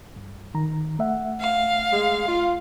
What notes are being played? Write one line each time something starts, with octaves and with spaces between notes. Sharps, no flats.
G2
D#3 A#5
A3 E5 F#5
F5
G#3
F4